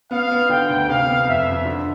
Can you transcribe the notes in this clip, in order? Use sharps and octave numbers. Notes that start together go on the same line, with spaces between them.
B3 F5
B3
D3 G5
D2
C3 F5
B3
F2 E5
F2
D3